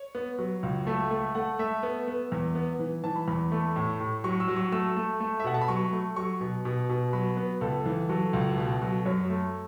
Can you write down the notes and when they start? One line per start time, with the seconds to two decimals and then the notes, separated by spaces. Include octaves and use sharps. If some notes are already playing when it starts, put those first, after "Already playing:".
Already playing: C#5
0.15 B3
0.39 F#3
0.63 C#2
0.87 A3 E5
1.11 A3
1.35 A3 F#5
1.59 A3 E5
1.83 B3
2.08 B3
2.32 E2
2.55 B3
2.79 E3
3.04 E3 A5
3.16 B5
3.28 E2 B5
3.52 A3
3.76 A2
4.00 A2
4.24 F#3 C#6
4.40 E6
4.48 F#3
4.56 C#6
4.72 A3 E6
4.96 A3
5.20 A3
5.40 E5
5.44 B2 F#5
5.54 A5
5.62 B5
5.68 F#3 C#6
5.93 A3
6.16 F#3 C#6
6.41 B2
6.65 B2
6.89 B2
7.13 F#3 B5
7.37 B3
7.61 C#2 A4
7.86 E3
8.09 F#3 A4
8.33 C#2
8.57 B2
8.82 F#3
9.05 F#2 C#5
9.30 A3